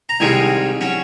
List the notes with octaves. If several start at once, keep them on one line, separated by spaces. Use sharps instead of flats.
A#5
C2 C3 D#3 G#3 G#5
F#3 C#4